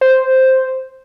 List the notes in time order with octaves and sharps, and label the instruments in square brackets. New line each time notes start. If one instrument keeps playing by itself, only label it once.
[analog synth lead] C5